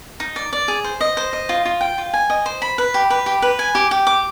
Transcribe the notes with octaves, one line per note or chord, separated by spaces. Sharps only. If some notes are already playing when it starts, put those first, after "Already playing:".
D#4
D5
D5
G#4
C5
D#5
C5
D#5
F4
F4
G5
F4
G#5
D#5
C5
B5
B4
G4
B4
G4
B4
G#5
G4
G4
D6